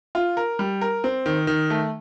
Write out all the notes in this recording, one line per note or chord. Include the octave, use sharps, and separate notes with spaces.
F4
A#4
G3
A#4
C4
D#3
D#3
A3